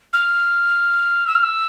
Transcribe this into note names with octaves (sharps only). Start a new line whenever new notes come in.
F6
E6
F6
E6